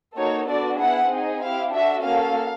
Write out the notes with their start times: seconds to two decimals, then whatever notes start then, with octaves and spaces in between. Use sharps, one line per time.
0.17 A#3 D#4 F#4 A4 C#5
0.48 B3 D4 F#4 A4 D5
0.79 B3 E4 G#4 F#5
1.11 C4 D#4 G#4
1.42 C4 E4 G4 F5
1.74 D4 F#4 A4 E5
2.05 A#3 C#4 F#4 A4 F5